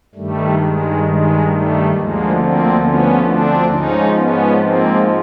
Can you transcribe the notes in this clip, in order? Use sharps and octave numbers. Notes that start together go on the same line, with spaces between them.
G2 D#3 G3 A3
G#3
G#3
G3 A3
D2 D3 F3 G#3 A#3
A#3 C4
B3 C#4
C4 D4
G#2 F3 C#4 D#4
B3 C#4
A#3 C4